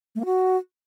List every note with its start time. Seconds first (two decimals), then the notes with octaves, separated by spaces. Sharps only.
0.15 A3
0.20 A#3
0.25 F#4